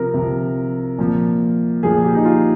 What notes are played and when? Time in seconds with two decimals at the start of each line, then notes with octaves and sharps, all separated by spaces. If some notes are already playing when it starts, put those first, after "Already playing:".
Already playing: C3 F3 A#4
0.14 C3 F3
0.98 A#2 F3
1.83 A#2 F3 G#4
2.04 G4
2.15 D#4
2.25 F4